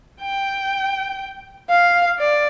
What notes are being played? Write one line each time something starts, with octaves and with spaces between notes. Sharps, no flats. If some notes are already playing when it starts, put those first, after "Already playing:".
G5
F5
D5